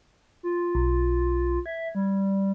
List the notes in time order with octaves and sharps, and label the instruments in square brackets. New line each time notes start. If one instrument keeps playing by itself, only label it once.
[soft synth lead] F4
[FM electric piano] B1
[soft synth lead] E5 [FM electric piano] G#6
[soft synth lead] G3